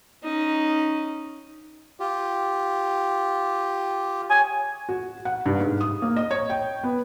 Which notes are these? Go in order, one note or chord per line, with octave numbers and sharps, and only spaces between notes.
C#4 D#4
F4 G4
C#5 G#5
F#4
F#5
G2
G#2
D#6
A#3
D#5
C#5
G5
B3